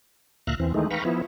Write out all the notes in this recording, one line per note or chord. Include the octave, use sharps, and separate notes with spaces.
D2 A#2 E5 F5 A#5 F#6
E2 E3 C4
D#3 E3 G#3 A3 D#4
B4 F5 G5 A#5 B5 C#6
F3 B3 E4